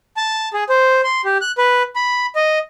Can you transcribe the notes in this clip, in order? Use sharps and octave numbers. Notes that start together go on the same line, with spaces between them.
A5
G#4
C5
C6
G4
F#6
B4
B5
D#5